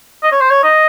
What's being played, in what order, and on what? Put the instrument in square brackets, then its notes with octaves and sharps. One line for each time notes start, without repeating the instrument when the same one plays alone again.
[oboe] D#5
C#5
C5
C#5
D#5